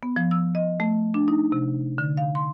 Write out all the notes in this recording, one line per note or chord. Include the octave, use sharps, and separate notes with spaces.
B3
F3
E6
D#5
A3
D4
D#4
C3
D3
F5
C6